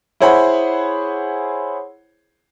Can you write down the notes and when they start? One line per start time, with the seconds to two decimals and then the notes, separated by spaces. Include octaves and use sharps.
0.20 E4 G#4 C5 C#5 F#5 B5